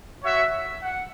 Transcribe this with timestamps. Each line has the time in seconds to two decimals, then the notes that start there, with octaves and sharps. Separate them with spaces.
0.23 F#4 C#5 E5
0.82 F#5